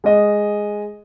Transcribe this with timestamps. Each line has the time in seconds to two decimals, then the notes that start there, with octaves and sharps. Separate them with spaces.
0.04 G#3 D#5